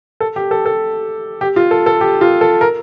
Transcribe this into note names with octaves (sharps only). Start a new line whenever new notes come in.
A4
G4
A4
A4
G4
F4
A4
A4
G4
F4
A4
A#4